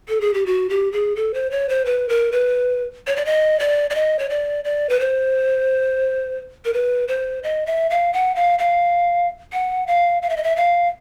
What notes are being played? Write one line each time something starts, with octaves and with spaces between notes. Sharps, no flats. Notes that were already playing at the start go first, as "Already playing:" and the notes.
A4
G#4
G4
F#4
G4
G#4
A4
C5
C#5
C5
B4
A#4
B4
C#5
D5
D#5
D5
D5
D#5
C#5
D5
D5
B4
C5
A#4
B4
C5
D#5
E5
F5
F#5
F5
F5
F#5
F5
F5
E5
D#5
E5
F5